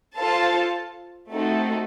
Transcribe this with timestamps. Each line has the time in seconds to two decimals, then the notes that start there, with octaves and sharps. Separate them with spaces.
0.18 F4 A4 C5 F5 A5
1.33 A3 C4 D#4 F#4 A4